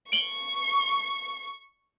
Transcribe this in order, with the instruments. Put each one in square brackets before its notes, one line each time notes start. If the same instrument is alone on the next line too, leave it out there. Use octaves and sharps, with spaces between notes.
[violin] C#6 [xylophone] D7 F#7 G7